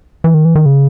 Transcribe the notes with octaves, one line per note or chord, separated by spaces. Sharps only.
E3
D#3
E3
D#3
C#3